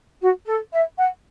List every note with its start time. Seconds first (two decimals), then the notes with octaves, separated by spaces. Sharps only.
0.21 F#4
0.46 A4
0.72 E5
0.98 F#5